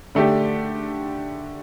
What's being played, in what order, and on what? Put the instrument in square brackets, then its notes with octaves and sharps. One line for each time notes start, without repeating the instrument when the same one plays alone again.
[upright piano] D3 A3 D4 G4